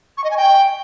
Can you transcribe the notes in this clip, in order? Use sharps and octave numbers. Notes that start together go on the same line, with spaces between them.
C#6
D#5
G#5
G5